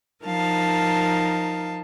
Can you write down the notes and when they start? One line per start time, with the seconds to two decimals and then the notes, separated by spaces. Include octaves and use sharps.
0.23 F3 D#4 A#4 F5 A5